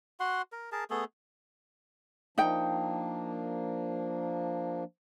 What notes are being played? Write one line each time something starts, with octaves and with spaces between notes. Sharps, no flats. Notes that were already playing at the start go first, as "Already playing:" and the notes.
F#4 F#5 C6
A#4
G#4 A#4 A5
A3 B3 G#4 A4
F3 A#3 D4 D#4 G5